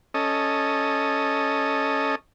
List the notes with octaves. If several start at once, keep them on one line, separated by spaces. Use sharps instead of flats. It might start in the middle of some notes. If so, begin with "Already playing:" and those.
C#4 A4 D#5